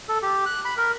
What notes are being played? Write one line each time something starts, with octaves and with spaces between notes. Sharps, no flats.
A4
G4
F#6
B5
A#4